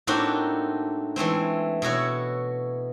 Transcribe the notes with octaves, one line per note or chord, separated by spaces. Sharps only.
A2 A#3 C4 D4 D#4 F#4
E3 G#3 A3 C4
B2 E4 F#4 C#5